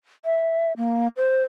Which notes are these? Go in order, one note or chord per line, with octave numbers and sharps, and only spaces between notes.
E5
A#3
C5